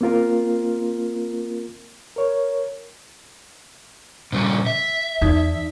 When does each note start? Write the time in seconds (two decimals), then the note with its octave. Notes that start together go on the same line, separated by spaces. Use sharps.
0.01 A#3 C4 F4 A#4
2.16 A#4 C#5
4.33 A#2 C#3 G3
4.66 E5
5.22 E2 D#4 D5 D#6